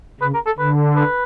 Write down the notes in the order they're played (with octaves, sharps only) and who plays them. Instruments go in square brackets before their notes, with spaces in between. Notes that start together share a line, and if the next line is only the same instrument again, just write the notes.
[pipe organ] C#3 [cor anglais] B4
[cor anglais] A#4
A4
[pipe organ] D3 [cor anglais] B4
[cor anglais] B4